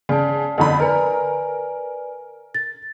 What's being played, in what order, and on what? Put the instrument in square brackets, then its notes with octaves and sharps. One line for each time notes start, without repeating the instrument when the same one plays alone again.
[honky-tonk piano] C#3 [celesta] D5 A5
[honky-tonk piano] F2 D3 B5
[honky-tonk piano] A#4 [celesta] B4 D5 G#5
[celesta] A6